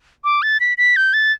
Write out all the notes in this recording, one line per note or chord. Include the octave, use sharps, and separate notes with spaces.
D6
A6
B6
B6
G6
A6